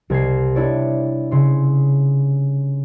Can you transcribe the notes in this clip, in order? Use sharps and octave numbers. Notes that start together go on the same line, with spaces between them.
C2 G#6 C7
D4 E4 C#5 D5
C#3 C#5 C6